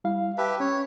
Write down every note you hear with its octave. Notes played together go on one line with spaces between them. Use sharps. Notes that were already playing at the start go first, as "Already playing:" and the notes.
G3 E4 F5
G4 B4 E5 G5 A5
C#4 C#5